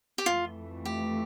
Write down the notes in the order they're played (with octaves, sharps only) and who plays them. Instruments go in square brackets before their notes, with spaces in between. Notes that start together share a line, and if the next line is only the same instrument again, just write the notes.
[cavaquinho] G4
[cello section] F2 E3 A3 [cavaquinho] F4
[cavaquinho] G4